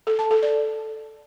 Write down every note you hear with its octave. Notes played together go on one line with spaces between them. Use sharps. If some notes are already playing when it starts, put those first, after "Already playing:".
A4
A5
A4
D5